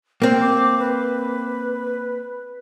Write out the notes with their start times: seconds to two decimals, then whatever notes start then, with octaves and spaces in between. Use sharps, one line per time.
0.22 A#3 C4 G5
0.40 D6
0.79 B4